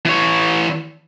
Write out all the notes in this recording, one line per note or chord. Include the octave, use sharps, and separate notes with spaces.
E3 C#5